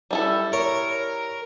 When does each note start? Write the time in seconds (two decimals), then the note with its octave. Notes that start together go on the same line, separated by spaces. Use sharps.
0.11 G3 E4 A4
0.53 A#4 C#5